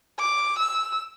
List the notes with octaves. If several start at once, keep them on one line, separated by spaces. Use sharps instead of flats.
D6
E6